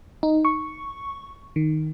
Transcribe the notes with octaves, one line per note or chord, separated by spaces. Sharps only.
D#4
C#6
D#3